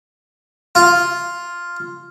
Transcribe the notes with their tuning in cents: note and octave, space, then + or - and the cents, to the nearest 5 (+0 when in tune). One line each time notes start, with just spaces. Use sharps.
F4 +0